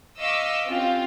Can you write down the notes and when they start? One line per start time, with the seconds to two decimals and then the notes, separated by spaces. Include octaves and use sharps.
0.18 D#5 F5 C#6 D6 E6 B6
0.66 C4 C#4 F4 G4